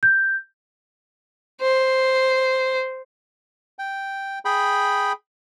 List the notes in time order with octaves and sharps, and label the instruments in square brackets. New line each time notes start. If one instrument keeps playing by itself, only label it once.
[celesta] G6
[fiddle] C5
[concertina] G5
G#4 G5 B5